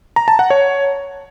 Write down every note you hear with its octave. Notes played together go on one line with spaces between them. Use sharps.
A#5
A5
F#5
C#5